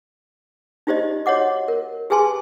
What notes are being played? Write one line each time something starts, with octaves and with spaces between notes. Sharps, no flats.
D#4 F4 G4 C5 D5 D#5
F#4 C#5 D#5 F#5 D6
A#4
G4 G#4 B4 G#5 A5 C6